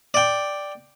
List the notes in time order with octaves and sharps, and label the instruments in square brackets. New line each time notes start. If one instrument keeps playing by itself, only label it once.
[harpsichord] D5 G5